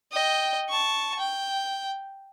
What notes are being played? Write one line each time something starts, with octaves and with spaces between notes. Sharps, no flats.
D#5 G5
A5 C#6
G5